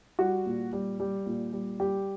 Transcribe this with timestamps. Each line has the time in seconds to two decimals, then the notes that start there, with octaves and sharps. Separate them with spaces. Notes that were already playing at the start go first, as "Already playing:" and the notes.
0.19 G3 F#4
0.46 A#2
0.73 G3
1.00 G3
1.26 A#2
1.53 G3
1.80 G3 G4